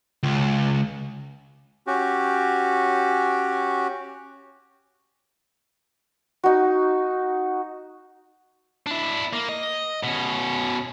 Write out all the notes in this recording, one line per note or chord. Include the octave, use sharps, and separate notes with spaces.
C#2
C#4 F#4 G4
D#4 F#4
D4 E4
A#3
D#5
B2 C#4